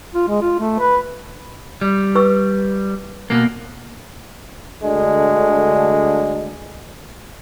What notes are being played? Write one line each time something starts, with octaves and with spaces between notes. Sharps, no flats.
F4
G#3
F4
A3
B4
G3
B4 C#6 E6
B2 A#3
D2 D3 G#3